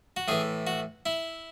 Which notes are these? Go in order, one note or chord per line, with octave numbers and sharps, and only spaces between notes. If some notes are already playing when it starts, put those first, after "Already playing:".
F#4
A2 E3 G#4
F#4
E4